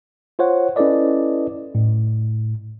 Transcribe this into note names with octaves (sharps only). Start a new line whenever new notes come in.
F4 C5 C#5 F#5
C#4 E4 A4 B4 D5 D#5
A2